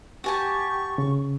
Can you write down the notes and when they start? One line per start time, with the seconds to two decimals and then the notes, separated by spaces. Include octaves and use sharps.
0.24 F#4 G4 G#5 A5 C#6
0.98 C#3